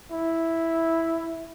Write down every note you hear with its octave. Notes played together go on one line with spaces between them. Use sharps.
E4